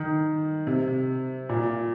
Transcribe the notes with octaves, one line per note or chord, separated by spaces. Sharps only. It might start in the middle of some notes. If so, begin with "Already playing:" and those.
Already playing: D#3
C3
A#2